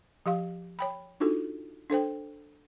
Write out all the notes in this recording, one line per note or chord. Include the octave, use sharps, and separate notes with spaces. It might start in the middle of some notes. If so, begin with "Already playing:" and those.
F3 G4 F5
C#5 G5 B5
D4 D#4 F4 F#4 A4
D4 A4 C5 G5